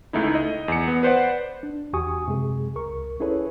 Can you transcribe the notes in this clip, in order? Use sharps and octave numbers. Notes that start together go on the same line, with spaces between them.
C#2 A3 D#4 E4
D#5
E2 C#7
B3
B4 C5 D5 F#5
D4
E2 F#4 G4 G#5 C#6 D#6
F#2 C3 G#3 G#4
C#2 A#4 C#6
C#4 E4 G#4 A4 B4 C#5